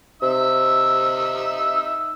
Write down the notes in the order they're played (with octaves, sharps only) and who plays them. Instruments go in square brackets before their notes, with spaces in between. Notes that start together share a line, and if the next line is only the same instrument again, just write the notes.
[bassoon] C3 [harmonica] D#4 E5 E6